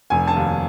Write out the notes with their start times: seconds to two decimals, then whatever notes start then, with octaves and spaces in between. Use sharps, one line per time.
0.10 F1 G#5
0.27 A5
0.36 D#2